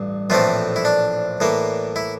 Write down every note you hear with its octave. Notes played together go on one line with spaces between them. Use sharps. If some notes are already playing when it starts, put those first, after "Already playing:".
Already playing: A1 G2
A#1 A2 E3 A3 C4 F4
E4
D4
A2 E3 A#3
E4